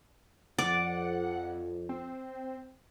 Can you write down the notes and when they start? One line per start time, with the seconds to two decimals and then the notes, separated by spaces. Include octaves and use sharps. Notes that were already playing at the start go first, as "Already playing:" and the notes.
0.58 F2 D5 F#5
1.89 C4